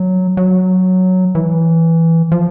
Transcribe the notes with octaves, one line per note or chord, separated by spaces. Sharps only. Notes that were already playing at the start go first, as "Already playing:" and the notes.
Already playing: F#3
F#3
E3
F3